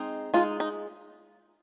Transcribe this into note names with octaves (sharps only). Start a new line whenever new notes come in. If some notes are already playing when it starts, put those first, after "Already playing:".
Already playing: G#3 C4 D#4
G#3 D#4 F4
D#4